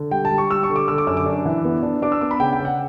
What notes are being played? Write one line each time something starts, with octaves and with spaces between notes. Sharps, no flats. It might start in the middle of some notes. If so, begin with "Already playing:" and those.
Already playing: D3
G3 G5
A5
G3
C#6
G3 E6
C#6
D3
D6
D3 E6
D6
F#2 E6
D6
D4
E3
B3
D4
D4 D6
E6
B3 D6
B5
C#3 G5
G5
C#3
F#5